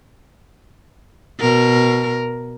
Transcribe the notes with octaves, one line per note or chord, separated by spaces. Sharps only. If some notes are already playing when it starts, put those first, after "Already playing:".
B2 A#4